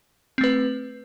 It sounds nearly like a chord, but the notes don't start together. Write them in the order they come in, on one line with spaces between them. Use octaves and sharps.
C4 A3 B4